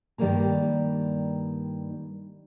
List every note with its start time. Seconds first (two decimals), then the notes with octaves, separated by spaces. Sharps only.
0.18 G2 D#3 G3 G#3 A#3 A#5